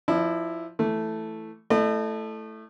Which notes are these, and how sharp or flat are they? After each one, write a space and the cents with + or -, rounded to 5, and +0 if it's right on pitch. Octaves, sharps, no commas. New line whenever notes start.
F3 +0 E4 +0 D5 +40
E3 +0 A3 +0
A3 +0 E4 +5 D#5 -40